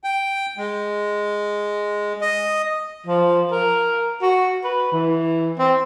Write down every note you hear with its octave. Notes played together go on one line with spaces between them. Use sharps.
G5
G#3
D#5
F3
A#4
F#4
B4
E3
C4